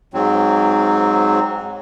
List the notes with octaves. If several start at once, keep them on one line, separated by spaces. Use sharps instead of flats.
G#2 F#3 C4